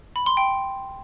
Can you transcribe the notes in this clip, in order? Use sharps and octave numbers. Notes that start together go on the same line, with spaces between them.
B5
C6
G5